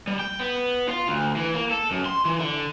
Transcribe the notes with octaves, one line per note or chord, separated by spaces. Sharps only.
G3
G5
B3
F4
D2
E3
A#3
A4
F#2
C6
E3
D3